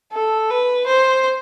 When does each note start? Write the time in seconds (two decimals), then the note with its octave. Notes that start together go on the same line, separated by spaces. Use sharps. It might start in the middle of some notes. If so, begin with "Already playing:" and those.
0.12 A4
0.50 B4
0.87 C5